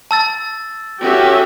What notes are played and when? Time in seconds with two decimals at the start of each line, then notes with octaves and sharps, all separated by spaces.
0.11 A5 E6 A6
1.01 C#4 F#4 G4 A4 E5